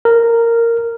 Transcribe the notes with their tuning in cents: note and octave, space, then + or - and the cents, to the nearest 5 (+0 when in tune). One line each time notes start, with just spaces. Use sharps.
A#4 -10